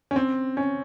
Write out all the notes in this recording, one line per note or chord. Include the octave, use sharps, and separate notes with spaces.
C#4
C4
C#4